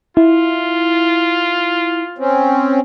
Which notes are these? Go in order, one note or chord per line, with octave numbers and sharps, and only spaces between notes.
E4 F4
C4 C#4